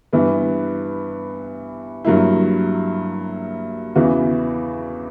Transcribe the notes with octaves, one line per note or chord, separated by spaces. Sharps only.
G2 E3 B3
G2 F#3 A#3 E4
E2 C#3 E3 B3 F#4